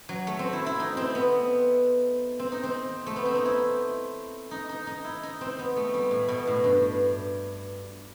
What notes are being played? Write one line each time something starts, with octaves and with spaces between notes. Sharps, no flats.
F#3
A3
C4
E4
E4
D#4
C4
B3
C4
D#4
C4
A3
B3
C4
D#4
E4
D#4
D#4
D#4
E4
D#4
C4
B3
A3
G3
A2
B2
A2
G2